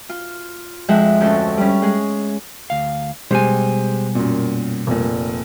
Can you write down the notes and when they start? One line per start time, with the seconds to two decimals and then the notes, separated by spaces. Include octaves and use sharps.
0.09 F4
0.88 F2 F3 G#3 E5 F#5
1.21 D2 C#4 A4
1.58 G3 C#4
1.82 G#3 G#4
2.70 D2 F5
3.31 B2 G3 G#3 G4 C5 G#5
4.15 F#2 A#2
4.87 F1 A#2